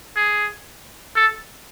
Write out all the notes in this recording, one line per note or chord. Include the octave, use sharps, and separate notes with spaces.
G#4
A4